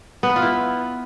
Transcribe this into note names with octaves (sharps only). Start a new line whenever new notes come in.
B3
B4
F4
E4